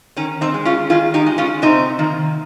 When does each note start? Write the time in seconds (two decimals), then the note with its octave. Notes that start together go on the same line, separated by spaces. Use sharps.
0.16 D#3 C#4
0.41 C4 D#4
0.54 G#3
0.65 C#4 F4
0.90 D#3 F4 G#4
1.14 D#4 G4
1.26 G#3
1.38 C#4 F4
1.62 C3 C4 D#4
1.99 D#3 A#3